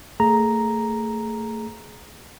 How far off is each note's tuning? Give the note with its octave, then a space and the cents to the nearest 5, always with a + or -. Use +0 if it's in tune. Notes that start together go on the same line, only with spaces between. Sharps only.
A3 +35 G#4 +15 A#5 +0